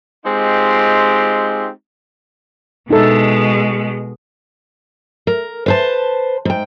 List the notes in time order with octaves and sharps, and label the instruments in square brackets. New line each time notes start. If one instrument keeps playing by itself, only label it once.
[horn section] G#3 C4 D#4 F4 G4
[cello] B2 G#3 [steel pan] D#4 A4
[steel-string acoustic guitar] A#4
B4 C5 A5
G#2 G5